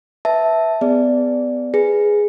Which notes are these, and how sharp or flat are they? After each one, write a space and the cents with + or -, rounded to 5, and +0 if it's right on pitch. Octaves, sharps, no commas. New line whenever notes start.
B4 +0 E5 -10 A5 +0
B3 +30 G#4 -15 D5 +0
G#4 +0 B4 +0